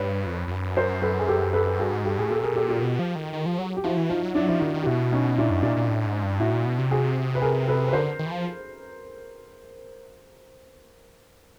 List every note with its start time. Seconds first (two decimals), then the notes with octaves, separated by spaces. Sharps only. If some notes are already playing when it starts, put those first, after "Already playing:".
Already playing: G2 B4 C#5
0.26 F2
0.47 F2
0.52 F#2
0.77 A#4 C5
1.02 A4 B4
1.19 G#4
1.28 G4 A4
1.53 A4 B4
1.80 G2 F#4 G#4
1.93 G#2
2.05 G2 G4 A4
2.18 A2 G#4
2.30 A#2 G4 A4
2.42 B2 G#4 A#4
2.54 A#2 G4 A4
2.69 F4 G4
2.82 B2
2.99 F3
3.15 D#3
3.33 D#3
3.46 F3
3.59 F#3
3.77 G4
3.84 F3 E4 F#4
3.97 E3
4.10 F3 D#4 F4
4.22 F#3
4.35 F#3 D4 E4
4.48 F3 E4 F#4
4.60 D#3 E4 F#4
4.74 D#3
4.82 G4
4.86 B2 E4 F#4
5.12 C#4 D#4
5.38 A#2 D4 E4
5.50 F#2
5.63 A#2 D4 E4
5.77 A#2
5.89 A2
6.06 G#2
6.23 G2
6.40 A2 E4 F#4
6.53 A#2
6.66 B2
6.78 C3
6.91 F#4 G#4
7.35 B4
7.42 G#4 A#4
7.67 A4 B4
7.88 B4
7.93 D3 A#4 C5
8.19 D#3
8.26 E3
8.31 F3